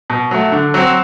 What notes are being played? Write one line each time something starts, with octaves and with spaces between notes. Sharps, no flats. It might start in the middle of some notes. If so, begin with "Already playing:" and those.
B2
F#3 A3
D3
F#3 C4